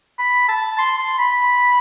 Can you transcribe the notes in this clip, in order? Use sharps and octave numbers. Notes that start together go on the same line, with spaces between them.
B5
A5
C6
C6
B5